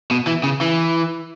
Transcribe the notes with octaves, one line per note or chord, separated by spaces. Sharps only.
B2
E3
C#3
E3